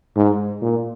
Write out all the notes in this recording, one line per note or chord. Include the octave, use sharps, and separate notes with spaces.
G#2
A#2